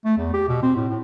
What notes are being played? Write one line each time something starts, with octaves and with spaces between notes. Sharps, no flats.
A3
E2
G4
B2
C4
A2
A2